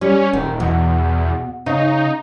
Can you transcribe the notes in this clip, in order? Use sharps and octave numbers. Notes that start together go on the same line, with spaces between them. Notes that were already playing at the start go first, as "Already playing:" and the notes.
G3 C#4
D#1 D#3
E2 B2
C#3 D#4